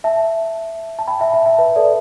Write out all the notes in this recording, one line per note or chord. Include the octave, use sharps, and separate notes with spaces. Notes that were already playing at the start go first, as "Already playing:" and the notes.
E5 A5
A5
G5 B5
E5 A5
E5 A5
E5 A5
B4 E5
A4 D5